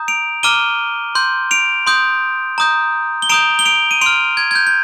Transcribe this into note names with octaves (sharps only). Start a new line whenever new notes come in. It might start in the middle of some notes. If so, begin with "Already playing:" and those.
Already playing: A#5 D#6 G6
D7 F7
A#5 D6 F6 D#7 G7
C6 G6
D7 F7
C6 D#6 G6
A#5 D#6 G6
G7
A#5 D#6 G6 D7 F7
G7
D7 F7
D#7
C6 F6 D7 F7
G#6
G#6
G6
G6